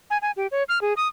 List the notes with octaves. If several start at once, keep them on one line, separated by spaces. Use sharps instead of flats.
G#5
G#5
G4
C#5
F6
G#4
D#6